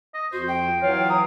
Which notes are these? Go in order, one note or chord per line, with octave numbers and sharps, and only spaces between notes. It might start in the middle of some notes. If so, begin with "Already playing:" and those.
D#5
F2 F#4 C5
G5
E3 F#3 F4 C#5
A#5 D#6